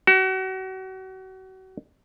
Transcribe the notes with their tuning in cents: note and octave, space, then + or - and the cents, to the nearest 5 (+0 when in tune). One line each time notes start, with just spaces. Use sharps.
F#4 +35